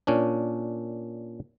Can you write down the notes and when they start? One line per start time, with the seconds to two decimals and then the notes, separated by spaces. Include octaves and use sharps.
0.07 A#2 C#4 D4